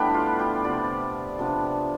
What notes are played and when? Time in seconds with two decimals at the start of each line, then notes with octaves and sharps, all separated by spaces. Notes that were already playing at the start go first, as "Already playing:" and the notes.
Already playing: A2 G3 A3 B3 D4 G4
0.14 F4
0.39 G4
0.64 C3 F3 B3 D5
1.39 C3 F3 B3 D4